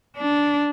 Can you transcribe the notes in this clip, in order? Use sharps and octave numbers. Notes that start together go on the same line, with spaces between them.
D4